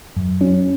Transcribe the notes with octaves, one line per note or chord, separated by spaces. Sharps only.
F#2
F#3 C#4